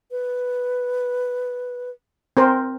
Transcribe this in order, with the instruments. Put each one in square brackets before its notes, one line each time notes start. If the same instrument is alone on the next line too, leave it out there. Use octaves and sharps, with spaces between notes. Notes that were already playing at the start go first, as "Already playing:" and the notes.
[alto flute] B4
[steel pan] C4 A#4 C5